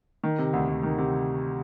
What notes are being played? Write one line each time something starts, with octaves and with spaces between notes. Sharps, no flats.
D#3
C3
D2
D2
D#3
C3